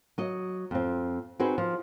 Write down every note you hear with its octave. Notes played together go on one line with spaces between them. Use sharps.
F#3 D#5
F2 C4
C4 D#4 F#4 G#4 B4
F3